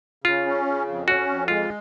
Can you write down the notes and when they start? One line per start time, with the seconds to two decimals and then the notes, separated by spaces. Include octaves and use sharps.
0.24 C#3 F4
0.46 C#4
0.66 C#3
0.87 F2
1.07 C#4 F#4
1.28 F2
1.48 G#3 F4